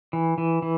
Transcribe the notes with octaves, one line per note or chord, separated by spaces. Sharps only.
E3
E3
E3